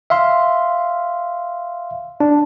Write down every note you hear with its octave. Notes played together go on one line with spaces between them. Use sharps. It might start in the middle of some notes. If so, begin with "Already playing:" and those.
E5 F5 C6
D4